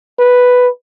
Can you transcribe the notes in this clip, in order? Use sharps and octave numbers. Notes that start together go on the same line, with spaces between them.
B4